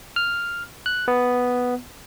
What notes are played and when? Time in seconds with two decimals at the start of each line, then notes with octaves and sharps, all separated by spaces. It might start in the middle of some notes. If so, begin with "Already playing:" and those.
0.16 F6
0.86 F#6
1.08 B3